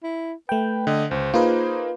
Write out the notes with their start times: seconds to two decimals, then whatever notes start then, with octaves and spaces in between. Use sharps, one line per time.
0.03 E4
0.49 A3 B4 G5
0.87 D3 D#5
1.11 C#2 C5
1.34 A#3 D#4 F4 G#4 B4